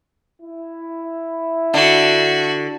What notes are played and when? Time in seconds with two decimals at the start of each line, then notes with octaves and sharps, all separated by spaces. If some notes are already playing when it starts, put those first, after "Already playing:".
0.42 E4
1.74 D3 F#4